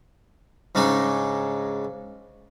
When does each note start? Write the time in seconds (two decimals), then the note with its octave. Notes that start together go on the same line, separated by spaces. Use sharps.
0.75 G#2 C#3 G#3 D4 D#4